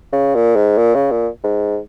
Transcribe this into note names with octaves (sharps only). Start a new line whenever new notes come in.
C#3
A#2
G#2
A#2
C#3
A#2
G#2